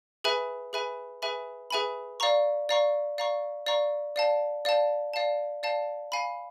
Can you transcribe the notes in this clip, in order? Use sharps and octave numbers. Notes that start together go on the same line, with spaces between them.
G#4 B4 E5 G#5 B5
G#4 B4 E5 G#5 B5
G#4 B4 E5 G#5 B5
G#4 B4 E5 G#5 B5
D5 F5 A#5 C#6
D5 F5 A#5 C#6
D5 F5 A#5 C#6
D5 F5 A#5 C#6
D5 F5 A5
D5 F5 A5
D5 F5 A5
D5 F5 A5
F5 G#5 B5